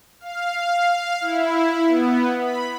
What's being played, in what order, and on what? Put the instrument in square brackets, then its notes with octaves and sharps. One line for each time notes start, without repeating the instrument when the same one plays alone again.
[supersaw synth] F5
E4
B3
B5